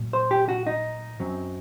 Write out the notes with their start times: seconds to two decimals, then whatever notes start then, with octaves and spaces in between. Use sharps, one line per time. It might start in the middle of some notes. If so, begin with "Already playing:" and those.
Already playing: A#2 F#3
0.13 C5
0.31 G4
0.49 F#4
0.67 D#4
1.20 F#2 F#3 C4